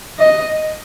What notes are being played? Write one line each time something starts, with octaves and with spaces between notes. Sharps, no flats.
D#5